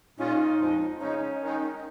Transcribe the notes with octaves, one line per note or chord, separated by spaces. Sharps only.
A#2 G#3 C#4 D#4 F4
F2 F3 G#3
C#3 G#3 C#4 D#4
D#3 G#3 D#4